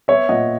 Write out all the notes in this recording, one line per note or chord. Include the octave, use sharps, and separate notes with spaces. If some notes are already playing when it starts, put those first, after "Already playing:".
B3 C#5 E5
A#2 D#5 F#5